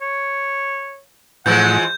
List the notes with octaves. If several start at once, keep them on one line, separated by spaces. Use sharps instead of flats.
C#5
A2 E3 F3 G#3 F#5 G6